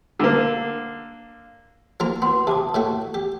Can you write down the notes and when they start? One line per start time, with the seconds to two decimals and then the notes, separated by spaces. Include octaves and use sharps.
0.19 D3 A#3
2.00 F3 A#3 F#4 A#5
2.22 B3 F#4 B4 C6
2.47 C3 A5 D6 D#6
2.74 A2 A3 F#4
3.14 G4